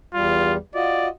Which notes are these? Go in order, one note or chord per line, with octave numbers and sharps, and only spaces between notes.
E2 G3 F4
F4 F#4 D5 D#5